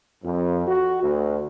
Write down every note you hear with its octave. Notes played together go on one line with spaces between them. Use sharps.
F2
F#4
D2